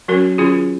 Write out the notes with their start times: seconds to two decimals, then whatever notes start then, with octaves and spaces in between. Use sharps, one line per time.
0.08 F#3 C#4 F#4 A#4
0.38 D#3 F#3 C#4 F4 G#4